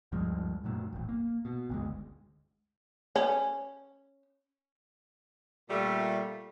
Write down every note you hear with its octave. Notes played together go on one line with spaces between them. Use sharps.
D2 G2 F3 G#3
F#2 A#2 F#3 A3
D#1 A1
A#3
B2
G1 D2 G#3
C#4
A#2 G3 A3